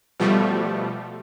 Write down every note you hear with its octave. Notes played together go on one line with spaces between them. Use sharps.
B2 F3 G3 A3